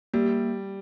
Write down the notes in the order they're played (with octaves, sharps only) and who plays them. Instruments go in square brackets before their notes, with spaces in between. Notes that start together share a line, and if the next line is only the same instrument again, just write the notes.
[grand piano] G3 [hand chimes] A#3